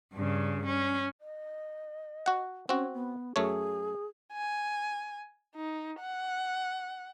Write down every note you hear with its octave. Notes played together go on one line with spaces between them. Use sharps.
G2 C#3
C#4
D#5
F#4 F#5
C4 C#4 F#4
B3
F#2 A3 G#4 C#5
G#5
D#4
F#5